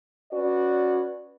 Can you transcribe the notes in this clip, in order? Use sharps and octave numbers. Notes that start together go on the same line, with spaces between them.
C#4 F#4 B4 D5